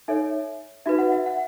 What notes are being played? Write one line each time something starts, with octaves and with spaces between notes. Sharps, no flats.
D#4 A4 C#5 E5
D#4 F#4 B4 E5
F#5
E5
F#5